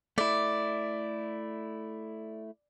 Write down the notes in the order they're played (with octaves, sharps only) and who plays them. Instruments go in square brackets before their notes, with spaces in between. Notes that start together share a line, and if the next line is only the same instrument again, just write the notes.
[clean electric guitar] A3 E4 [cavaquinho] D5